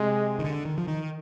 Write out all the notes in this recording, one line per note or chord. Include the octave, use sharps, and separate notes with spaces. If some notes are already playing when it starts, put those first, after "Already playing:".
Already playing: C3 G#3
D#3
D3
D#3
F3
D#3